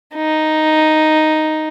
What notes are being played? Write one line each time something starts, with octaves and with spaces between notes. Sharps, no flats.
D#4